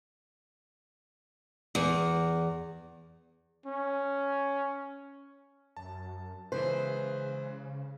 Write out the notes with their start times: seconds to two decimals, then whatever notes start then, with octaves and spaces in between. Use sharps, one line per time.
1.75 E2
3.66 C#4
5.77 F#2 A5
6.52 C#3 E3 G#3 B4 C5